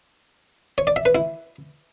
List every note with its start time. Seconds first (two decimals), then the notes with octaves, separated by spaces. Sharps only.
0.78 C#5
0.87 D5
0.96 E5
1.06 B4
1.15 E4